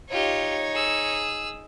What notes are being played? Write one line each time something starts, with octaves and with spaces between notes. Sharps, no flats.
D#4 F4 G4 C#5
G#4 E6